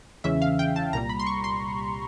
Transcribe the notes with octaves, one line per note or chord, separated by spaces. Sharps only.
E2 C#3 E3 G#3 C#4 E5
F5
G5
A5
C2 A#2 G3 A#5
B5
C6
C#6
C6